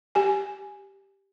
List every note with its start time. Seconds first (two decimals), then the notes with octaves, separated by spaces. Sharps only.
0.15 G4 G#5